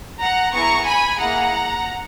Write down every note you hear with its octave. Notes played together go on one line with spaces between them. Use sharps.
F#5 A#5
B3 E4 G#4 A#5 C#6
G#5 B5
A#3 E4 G#4 F#5 A#5